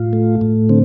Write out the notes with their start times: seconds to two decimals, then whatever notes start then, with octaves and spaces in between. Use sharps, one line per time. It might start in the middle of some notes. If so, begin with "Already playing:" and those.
Already playing: A2 F4
0.13 A3
0.41 A2
0.69 D3 C4